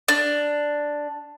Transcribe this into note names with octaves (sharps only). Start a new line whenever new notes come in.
D4